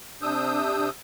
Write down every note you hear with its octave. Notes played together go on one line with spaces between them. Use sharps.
C3 D4 D#6 E6 G6